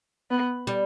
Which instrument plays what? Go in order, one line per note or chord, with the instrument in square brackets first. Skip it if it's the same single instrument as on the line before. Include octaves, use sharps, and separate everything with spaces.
[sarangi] B3
[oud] G3